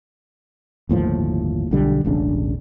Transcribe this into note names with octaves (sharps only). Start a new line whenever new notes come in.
G1 D#2 A2 F3
B1 D3 G3
E1 A1 C#3 D4